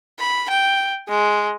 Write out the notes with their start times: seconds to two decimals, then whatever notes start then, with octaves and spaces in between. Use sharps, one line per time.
0.19 B5
0.50 G5
1.09 G#3